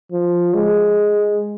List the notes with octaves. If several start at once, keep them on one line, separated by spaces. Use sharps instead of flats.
F3
G#3